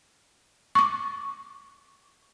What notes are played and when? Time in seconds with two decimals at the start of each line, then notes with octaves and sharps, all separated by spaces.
0.75 C#6 D6